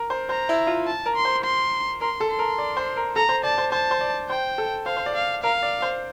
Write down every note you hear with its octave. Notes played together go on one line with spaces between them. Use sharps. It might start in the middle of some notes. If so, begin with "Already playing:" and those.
Already playing: A#4
C5
C5 A#5
E4
F4
A5
A#4
C6
C5
C6
A#4 C6
A4
C6
A#4
D5
C5
A#4
A4 A#5
C5
D5 A5
C5
C5 A5
C5
D5
C5 G5
A4
C5 F5
C5
D5
F5
A#4 F5
D5
C5